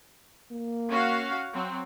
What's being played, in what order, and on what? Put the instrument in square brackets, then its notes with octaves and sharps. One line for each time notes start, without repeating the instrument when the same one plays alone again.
[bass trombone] A#3
[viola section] C#4 F#4 F5
F#3 C4